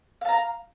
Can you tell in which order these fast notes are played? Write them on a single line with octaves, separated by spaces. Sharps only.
F5 A5 A#5